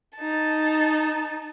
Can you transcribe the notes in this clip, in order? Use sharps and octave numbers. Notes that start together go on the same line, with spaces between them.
D#4 A5